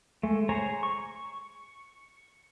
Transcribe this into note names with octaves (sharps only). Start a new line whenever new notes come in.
G#3 A3
G#4 C5 C#5 G#5 A#5
C#6